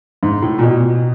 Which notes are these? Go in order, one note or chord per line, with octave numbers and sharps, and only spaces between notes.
G#2
A2
A#2
B2